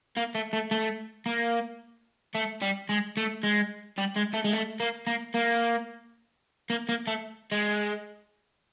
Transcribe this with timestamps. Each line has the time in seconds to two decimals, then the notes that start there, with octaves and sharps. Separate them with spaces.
0.17 A#3
0.35 A3
0.53 A3
0.71 A3
1.26 A#3
2.35 A3
2.62 G3
2.89 G#3
3.17 A3
3.43 G#3
3.98 G3
4.16 G#3
4.34 A3
4.44 G#3
4.53 A3
4.80 A#3
5.07 A#3
5.34 A#3
6.70 A#3
6.89 A#3
7.07 A3
7.52 G#3